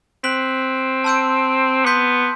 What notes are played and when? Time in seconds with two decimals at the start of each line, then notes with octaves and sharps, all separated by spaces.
0.24 C4 F#6 B6 F#7
1.04 A5 C6 E6 G6 D7
1.85 B3 C6 G6 B6